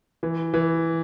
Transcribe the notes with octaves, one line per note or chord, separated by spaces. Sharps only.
E3
E3